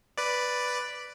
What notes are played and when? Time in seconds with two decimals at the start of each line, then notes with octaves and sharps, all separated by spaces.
0.18 B4 D5